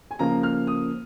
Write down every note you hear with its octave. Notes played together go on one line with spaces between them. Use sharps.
G#5
C#3 F3 A#3 A#5
F6
D#6